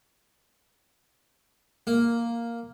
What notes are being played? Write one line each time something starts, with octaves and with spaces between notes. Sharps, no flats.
A#3